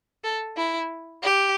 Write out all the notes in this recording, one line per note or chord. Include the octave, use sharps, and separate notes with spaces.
A4
E4
G4